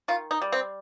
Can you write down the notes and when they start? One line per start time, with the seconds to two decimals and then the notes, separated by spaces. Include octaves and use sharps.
0.08 D#3 F4
0.31 D#4
0.42 G3
0.52 C4